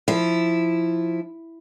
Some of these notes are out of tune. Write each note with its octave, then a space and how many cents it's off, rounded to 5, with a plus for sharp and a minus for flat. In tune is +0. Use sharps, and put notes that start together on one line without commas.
F3 +0 E4 +0